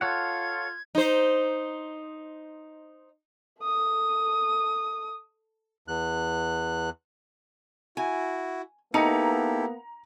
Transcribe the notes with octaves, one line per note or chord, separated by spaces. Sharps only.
F4 A4 C#5 F#5 G#6
D#4 C5
A4 D#6
E2 F#6
E4 F#4 G#5
A#3 B3 D#4 E4 G4 A4 A#5 C#7